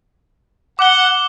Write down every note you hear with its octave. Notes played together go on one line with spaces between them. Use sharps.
F#5 D6 G7